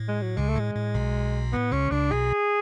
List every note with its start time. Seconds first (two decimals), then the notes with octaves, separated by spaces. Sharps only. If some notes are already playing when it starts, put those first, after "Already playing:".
Already playing: A2
0.08 G#3
0.22 F#3
0.36 C#2 C#3 G#3
0.49 A3
0.56 A2 G#3
0.76 A2
0.94 B1 B2
1.53 A2 B3
1.72 C#2 C#3 C#4
1.91 C#2 C#3 D4
2.11 B1 B2 G#4